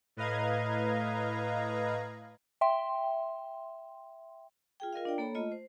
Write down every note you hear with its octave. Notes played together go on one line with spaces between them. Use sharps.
A2 B4 D#5 F5 A#5 G#6
E5 G5 C6
F4 G#4 G5
F4 A#4 D#5 F5
D4 D5 G5
A#3 A4 C#5 A#5 B5
A3 F4 D#5
C5